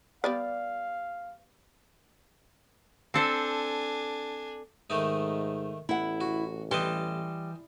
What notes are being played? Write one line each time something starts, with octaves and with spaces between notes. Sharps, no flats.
G3 B3 D5 F5
C4 D4 A4 C5 G#5
G#2 D#3 A3 D#4
A1 E4 F#5
F#4
E3 G3 D#5 A5 C6